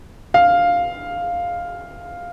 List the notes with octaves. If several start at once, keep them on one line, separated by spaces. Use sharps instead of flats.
F5